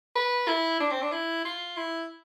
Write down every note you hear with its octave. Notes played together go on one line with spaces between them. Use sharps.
B4
E4
D4
C4
D4
E4
F4
E4